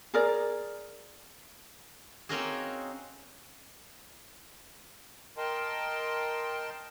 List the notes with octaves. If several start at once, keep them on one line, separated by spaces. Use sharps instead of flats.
G#4 A#4 D5
A#3 C4 C#4 D#4 F#4 G#4
A#4 D#5 G5 A5 C6